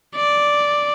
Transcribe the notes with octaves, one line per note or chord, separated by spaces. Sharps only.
D5